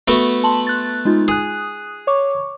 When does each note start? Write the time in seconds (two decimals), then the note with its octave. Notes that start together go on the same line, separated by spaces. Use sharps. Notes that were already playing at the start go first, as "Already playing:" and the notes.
0.08 A3 B3 F#4
0.44 A5 C6 F#7
0.67 F#6 A6
1.05 G#3 D#4 F4
1.28 G#4 D#6 F#6
2.07 C#5 C#6 D6